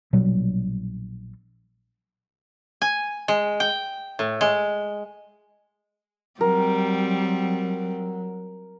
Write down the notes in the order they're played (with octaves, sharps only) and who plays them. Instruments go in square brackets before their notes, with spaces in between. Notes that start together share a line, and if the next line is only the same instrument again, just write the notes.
[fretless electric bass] A#1 B2 F#3 G3
[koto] G#5
G#3
G5
A2
G#3
[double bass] F#3 [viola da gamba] G3 C4 [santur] A#4